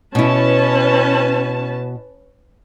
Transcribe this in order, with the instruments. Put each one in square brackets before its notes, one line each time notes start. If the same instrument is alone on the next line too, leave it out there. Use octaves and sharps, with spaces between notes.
[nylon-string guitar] B2 E4 [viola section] C#4 B4 A5